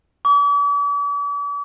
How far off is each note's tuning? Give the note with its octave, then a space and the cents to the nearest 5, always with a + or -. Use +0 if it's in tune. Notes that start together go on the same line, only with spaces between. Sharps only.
D6 -45